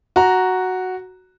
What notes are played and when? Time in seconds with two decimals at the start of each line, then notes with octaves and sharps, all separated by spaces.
0.16 F#4 A#5